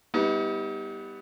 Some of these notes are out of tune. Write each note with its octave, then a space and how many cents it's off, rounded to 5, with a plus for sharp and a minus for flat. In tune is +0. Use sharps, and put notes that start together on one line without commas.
G3 +5 B3 +0 D#4 +45